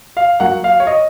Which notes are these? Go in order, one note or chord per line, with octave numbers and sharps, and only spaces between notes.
F5
F#3 A#3 F#5
F5
C#5
D#5